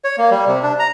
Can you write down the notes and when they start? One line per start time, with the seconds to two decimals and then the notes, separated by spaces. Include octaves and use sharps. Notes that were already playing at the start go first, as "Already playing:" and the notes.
0.04 C#5
0.18 A#3
0.31 G3
0.47 C3
0.63 D4
0.79 A#5